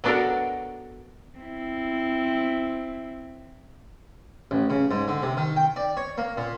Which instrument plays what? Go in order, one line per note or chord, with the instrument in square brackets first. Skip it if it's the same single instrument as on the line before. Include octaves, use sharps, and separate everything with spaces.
[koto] F#3 B3 D4 F#4 A4 A#4
[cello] C4 E4
[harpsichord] A1
C#3
G#2
D3
C3
D#3
G5
D5
C#5
A#3
A#2